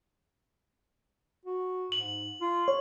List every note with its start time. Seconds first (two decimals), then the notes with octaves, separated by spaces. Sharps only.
1.46 F#4
1.92 G#2 F#7
2.41 F4
2.68 C#5